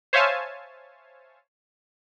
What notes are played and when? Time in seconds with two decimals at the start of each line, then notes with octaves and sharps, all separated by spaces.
0.13 C5 C#5 E5 F5 G#5 A5